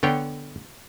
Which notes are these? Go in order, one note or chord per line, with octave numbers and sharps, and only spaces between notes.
D3 B3 C#5 G5